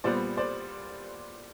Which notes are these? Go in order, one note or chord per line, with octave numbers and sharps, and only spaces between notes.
A#2 G3 B3 C5 D5
C5 D5